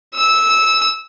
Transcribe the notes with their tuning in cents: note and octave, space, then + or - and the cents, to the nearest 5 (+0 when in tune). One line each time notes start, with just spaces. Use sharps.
E6 -15